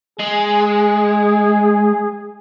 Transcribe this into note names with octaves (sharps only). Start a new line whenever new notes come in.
G#3 G#4